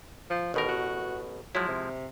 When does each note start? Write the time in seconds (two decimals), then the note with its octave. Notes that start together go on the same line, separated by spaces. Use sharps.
0.30 F3
0.54 A1 B2 D#3 A#4
0.69 F#4
1.55 F3 F#3 G#3 E4
1.68 C3